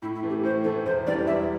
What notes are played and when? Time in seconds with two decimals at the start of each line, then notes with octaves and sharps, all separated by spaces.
0.02 A2 E4
0.15 E4
0.23 E3 A3
0.30 G4
0.43 A2 C5
0.64 E3 A3 A4
0.86 E1 C5
1.06 E2 E3 G3 D4 D5
1.27 E1 E5